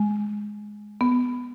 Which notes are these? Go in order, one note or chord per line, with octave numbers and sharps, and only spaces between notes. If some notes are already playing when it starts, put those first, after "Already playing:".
Already playing: G#3
B3